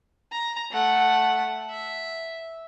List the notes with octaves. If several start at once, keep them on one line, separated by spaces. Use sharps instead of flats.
A#5
A3 F#5
E5